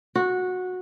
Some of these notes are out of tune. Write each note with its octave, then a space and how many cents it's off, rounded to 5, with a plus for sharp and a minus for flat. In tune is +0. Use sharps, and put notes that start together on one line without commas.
F#4 -15